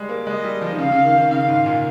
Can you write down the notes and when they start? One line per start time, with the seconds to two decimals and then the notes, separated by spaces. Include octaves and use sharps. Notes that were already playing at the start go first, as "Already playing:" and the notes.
Already playing: G3 G#3
0.09 A#3
0.27 G#3 D#5
0.44 G3
0.61 F3
0.72 D#3
0.79 C#3 F5
0.92 C#3
1.05 D#3
1.18 D#3
1.31 C#3 F5
1.48 G#2
1.66 A#2